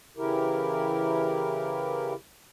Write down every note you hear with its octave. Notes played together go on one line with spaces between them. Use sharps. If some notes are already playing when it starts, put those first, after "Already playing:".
C#3 E3 E4 G4 A#4